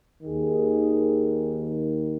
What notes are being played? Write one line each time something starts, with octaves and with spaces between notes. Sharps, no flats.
D#2 D#3 G#4